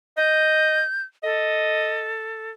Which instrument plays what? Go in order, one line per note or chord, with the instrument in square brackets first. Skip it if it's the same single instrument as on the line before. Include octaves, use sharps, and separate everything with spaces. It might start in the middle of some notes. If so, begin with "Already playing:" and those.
[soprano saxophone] D#5 [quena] G6
[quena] A4 [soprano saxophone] D#5